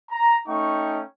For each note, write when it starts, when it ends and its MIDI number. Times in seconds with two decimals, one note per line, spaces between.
0.11 0.40 82
0.48 1.02 57
0.48 1.02 61
0.48 1.02 63
0.48 1.02 79
0.48 1.02 85